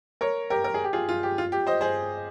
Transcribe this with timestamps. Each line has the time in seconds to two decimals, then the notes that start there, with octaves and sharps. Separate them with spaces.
0.21 A#4 C#5
0.50 G4 A#4
0.64 A#4
0.74 G#4
0.84 G4
0.93 F4 G#4
1.09 F4
1.23 G4
1.38 F4
1.52 G4
1.67 C5 D#5
1.81 G#4 C5